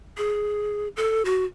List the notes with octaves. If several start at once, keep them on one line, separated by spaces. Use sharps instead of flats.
G#4
A4
F#4